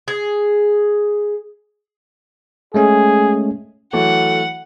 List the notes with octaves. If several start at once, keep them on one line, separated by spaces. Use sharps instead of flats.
G#4
G#3 A3 C#4 G#4
E3 F#3 A3 F#5